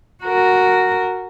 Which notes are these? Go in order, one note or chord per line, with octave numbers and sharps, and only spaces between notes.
F#4 A#4